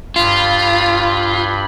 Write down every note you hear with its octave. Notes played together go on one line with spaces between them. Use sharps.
G2 F4 B5